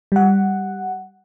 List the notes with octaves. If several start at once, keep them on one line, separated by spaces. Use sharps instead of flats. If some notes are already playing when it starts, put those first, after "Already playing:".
G3 F#5